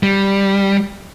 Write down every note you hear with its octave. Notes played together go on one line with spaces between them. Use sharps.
G3